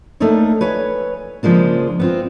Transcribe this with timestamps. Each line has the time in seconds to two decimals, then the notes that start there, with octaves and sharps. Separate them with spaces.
0.20 A3 A#3 D4 D#4 C#5
0.61 B4 C#5 G#5
1.43 C#3 F3 G#3 A#3 D4
2.00 B3 C4 F4